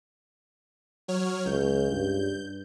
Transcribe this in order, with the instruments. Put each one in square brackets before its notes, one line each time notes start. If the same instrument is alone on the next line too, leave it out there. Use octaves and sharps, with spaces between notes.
[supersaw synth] F#3 C#5 F6
[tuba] C#2 [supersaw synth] G6
[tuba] G2